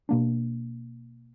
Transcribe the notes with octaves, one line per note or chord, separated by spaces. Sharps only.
B2 A#3 D4